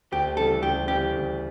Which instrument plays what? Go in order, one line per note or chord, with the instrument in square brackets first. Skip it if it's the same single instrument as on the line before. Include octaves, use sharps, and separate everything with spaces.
[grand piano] D2 [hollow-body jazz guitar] G4
[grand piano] C#3 E3 G3 [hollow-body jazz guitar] A4
[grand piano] D2 [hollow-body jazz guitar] G4
[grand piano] C#3 E3 G3 [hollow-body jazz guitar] G4
[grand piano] D2